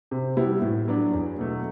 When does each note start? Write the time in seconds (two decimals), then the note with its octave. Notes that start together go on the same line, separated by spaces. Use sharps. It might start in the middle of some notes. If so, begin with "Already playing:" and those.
0.11 C3
0.37 G3 B3 E4
0.62 A2
0.88 F#3 B3 D4
1.13 E2
1.38 B2 F#3 A3